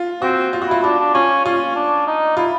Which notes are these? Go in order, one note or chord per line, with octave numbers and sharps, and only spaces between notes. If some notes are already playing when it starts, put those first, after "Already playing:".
Already playing: F4
C4 F#4
F4
F#4
E4 F4
D4 F4
D4
C#4 F4
C#4 F4
D4
D#4
E4 F4